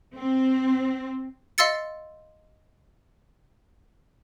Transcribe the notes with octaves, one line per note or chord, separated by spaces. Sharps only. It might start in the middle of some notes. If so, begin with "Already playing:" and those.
C4
D#5 F5 C6 E6 A6 C#7